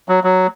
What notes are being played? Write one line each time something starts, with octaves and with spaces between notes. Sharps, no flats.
F#3
F#3